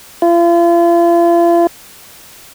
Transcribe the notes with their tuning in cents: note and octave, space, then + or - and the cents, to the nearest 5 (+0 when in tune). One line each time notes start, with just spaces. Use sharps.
F4 -40